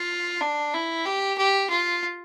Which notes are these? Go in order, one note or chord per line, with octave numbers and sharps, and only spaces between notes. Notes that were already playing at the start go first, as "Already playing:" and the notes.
Already playing: F4
D4
E4
G4
G4
F4